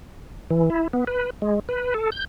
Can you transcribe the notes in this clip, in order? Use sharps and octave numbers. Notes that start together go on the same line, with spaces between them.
E3
E4
B3
B4
G#3
B4
A4
G6